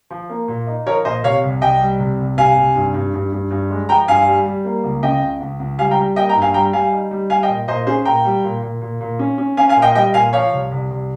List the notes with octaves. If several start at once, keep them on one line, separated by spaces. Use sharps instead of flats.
F3
A#3
A#2
D#4
F3 A#4 C#5
A#2 C5 D#5
C3 C#5 F5
C2
C2 D#5 G5
G3
C3
C2
C3 F5 G#5
C3
G2
G2
G2
G2
G2
G#3
F3 G5 A#5
G2 F5 G#5
G3
G3
A#3
C#2
C#3 D#5 G5
C#2
C#2
C#2
G3 F5 G#5
G5 A#5
G3
A#3 D#5 G5
G5 A#5
G2
F5 G#5
G3 G5 A#5
G3 F5 G#5
D#4
G3
G3 F5 G#5
D#5 G5
A#2
A#2 C5 D#5
C#4 G#4 C5
A#2 G5 A#5
G3
A#2
A#2
A#2
A#2
C#4
C#4
C#4 F5 G#5
F5 G#5
A#2
D#5 G5
G3 D#5 G5
A#2 F5 G#5
F3 C#5 F5
C2
C2
C2